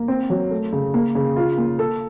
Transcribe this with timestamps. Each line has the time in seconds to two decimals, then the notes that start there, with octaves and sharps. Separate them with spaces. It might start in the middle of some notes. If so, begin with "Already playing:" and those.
Already playing: A#3
0.08 C4
0.30 F#3
0.51 A3
0.73 C#3
0.94 A#3
1.15 C#3
1.36 F4
1.58 A#3
1.79 A4